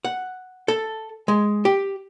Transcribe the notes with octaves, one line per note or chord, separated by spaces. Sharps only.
F#5
A4
G#3
G4